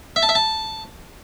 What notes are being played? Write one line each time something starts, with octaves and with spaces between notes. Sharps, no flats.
E5
A5
E5
A5